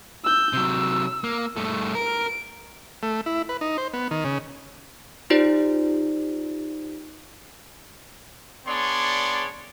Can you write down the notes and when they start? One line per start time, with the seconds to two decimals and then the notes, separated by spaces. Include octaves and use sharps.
0.24 E6 G6
0.53 C3 F#3 E6
1.24 A#3
1.56 G2 A3
1.95 A#4 D7
3.03 A3
3.26 E4
3.49 B4
3.61 D#4
3.78 C5
3.94 B3
4.11 D#3
4.24 C#3
5.30 D#4 F4 G4 C5 D5
8.67 B3 D4 G#4 C#5 D5 C6